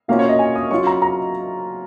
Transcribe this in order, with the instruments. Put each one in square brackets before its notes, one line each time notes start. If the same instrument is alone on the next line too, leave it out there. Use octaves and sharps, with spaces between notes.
[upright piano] B2 A#3 C#4 F4 F5
C#5
D#5
G#5
D#6
F#3 C#4 F4 C#6
A#5
A#5